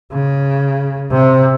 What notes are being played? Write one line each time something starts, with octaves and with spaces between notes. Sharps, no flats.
C#3
C3